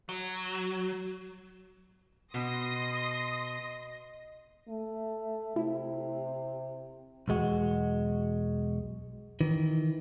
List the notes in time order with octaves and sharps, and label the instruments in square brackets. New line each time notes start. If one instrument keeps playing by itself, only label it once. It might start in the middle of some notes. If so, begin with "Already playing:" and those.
[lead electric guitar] F#3
[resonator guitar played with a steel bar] B2 [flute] D#5 [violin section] C6 D#6 A#6
[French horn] A3
[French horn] C3 [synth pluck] E4
[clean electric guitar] B1 E2 G#3 F#4
D#3 E3